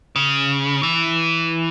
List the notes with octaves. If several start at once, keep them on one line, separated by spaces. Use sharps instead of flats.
C#3
E3